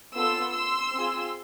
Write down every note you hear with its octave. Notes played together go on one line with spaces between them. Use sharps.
B3 F4 A4 C6 E6
C6 E6
C4 F4 G#4